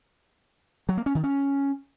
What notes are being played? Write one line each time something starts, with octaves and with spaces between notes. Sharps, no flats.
F#3
A#3
C#4
D#3
C#4